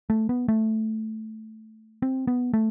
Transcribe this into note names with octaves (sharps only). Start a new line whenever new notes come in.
A3
B3
A3
C4
B3
A3